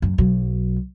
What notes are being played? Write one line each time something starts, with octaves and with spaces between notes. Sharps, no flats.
F#2
B1 F#3